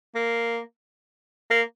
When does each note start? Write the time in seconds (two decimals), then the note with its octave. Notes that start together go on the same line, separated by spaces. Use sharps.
0.15 A#3
1.51 A#3